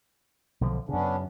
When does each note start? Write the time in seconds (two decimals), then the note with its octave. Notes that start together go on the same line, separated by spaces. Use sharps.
0.61 B1 D3 F3
0.89 F#2 C#3 B3 C#4 D4